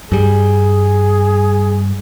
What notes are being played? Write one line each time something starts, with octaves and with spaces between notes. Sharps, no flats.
G2 G3 G#4